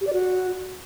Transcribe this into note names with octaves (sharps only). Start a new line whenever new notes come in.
G4
D5
F#4